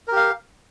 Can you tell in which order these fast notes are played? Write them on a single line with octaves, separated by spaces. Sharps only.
A#4 G4 F5